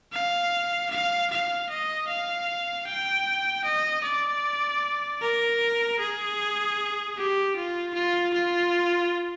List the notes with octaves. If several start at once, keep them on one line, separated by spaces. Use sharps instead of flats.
F5
F5
F5
D#5
F5
G5
D#5
D5
A#4
G#4
G4
F4
F4
F4